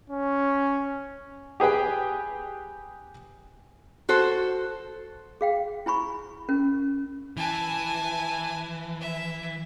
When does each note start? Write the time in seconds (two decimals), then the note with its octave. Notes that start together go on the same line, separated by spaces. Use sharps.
0.10 C#4
1.60 G4 G#4 B4 G5
4.09 F#4 A4 C5
5.41 G#4 F5 G5
5.86 E4 G#5 B5 C#6
6.49 C#4 A#4
7.37 E3 G#5 A5
9.00 E5